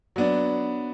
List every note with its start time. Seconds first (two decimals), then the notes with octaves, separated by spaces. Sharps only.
0.16 F#3 B3 D4